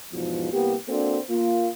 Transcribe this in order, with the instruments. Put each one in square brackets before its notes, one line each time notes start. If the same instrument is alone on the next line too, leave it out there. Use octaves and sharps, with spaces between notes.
[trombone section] E2 G#2 B2 F3
C2 A#3 B3 G4
A#3 C4 D4 F#4 A4 C5
A#3 F4